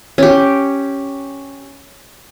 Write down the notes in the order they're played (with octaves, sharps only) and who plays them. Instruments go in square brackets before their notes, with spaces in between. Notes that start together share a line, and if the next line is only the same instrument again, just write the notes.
[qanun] C#4 G4